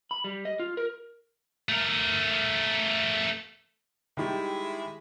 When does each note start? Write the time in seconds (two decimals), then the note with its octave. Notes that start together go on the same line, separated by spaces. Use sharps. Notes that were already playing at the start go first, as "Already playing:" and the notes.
0.11 B5
0.24 G3
0.45 D#5
0.59 F4
0.77 A#4
1.69 A3 A#4
4.17 D#3 G3 G#3 E4 G4